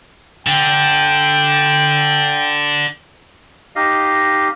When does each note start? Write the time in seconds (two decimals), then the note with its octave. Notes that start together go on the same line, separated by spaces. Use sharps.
0.47 D3 G5
3.76 D#4 G4 D#5 F5